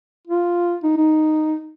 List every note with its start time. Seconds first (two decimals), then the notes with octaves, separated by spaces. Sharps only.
0.27 F4
0.84 D#4
0.97 D#4